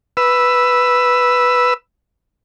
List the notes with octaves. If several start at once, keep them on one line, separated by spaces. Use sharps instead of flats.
B4 E6